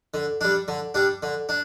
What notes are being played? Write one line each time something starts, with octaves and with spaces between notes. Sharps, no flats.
D3
G3 D4
D3
G3 D4
D3
D4